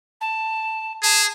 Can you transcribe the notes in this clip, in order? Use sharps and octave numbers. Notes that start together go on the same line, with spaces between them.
A5
G#4 A5